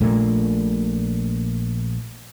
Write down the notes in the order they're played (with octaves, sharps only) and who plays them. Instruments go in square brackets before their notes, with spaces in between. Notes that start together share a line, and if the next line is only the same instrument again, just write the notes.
[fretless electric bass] A#1 A#2 A3 A#3